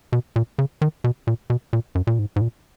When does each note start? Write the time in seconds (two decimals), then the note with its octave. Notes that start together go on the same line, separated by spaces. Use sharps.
0.13 B2
0.36 A#2
0.59 C#3
0.82 D#3
1.04 B2
1.27 A#2
1.50 B2
1.73 A#2
1.95 F#2
2.07 A#2
2.19 G#2
2.36 G#2
2.41 A#2